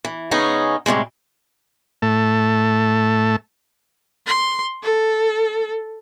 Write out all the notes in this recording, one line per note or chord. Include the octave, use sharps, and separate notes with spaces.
E3
C#3 G#3 B3 C#4 D#4 G#4
A2 C3 G3 G#3
A2 A3 A5
C6
A4